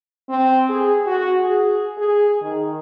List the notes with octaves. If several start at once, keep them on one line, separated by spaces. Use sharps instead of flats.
C4
G#4
F#4
G#4
G#4
D#3